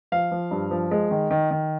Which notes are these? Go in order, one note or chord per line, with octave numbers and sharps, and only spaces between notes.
F3 F5
F3
G2
F3
G#3
D#3
D#3
D#3